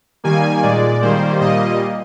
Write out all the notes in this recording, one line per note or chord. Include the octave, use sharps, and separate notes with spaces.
D#3 G3 A#3 G#5
A#2 G#3 D5
D#3 G3 A#3 C5
A#2 G3 A#3 D#5